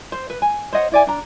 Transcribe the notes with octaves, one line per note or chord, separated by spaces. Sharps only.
C5
B4
G#5
C5 C#5 D#5 F#5
E4 D5 G#5
D4 A#5